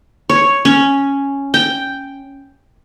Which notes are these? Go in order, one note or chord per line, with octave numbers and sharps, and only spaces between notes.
C#5
C#4
G5